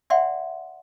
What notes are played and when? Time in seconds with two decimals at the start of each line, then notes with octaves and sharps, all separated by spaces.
0.10 D5 E5 F#5 G5 C6